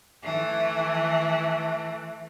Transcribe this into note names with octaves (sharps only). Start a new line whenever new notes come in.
E3 A3